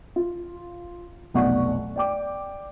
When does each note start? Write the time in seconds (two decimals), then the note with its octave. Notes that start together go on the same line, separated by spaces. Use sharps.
0.16 F4
1.34 F1 B1 B3 D5 F#5 C#6
1.96 D5 G5 D6